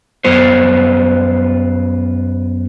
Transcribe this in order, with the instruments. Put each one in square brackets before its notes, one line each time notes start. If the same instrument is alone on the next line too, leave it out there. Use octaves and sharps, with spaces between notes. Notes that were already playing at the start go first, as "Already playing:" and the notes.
[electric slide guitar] F#2 B3 F4 C5